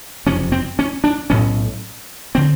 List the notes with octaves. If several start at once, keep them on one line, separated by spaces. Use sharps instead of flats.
F#1 F2 C3 C#4
C4
C#4
D4
B1 A2 C#4
D3 C4